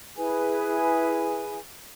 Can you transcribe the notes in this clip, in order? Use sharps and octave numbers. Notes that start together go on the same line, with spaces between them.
E4 G#4 B4 G#5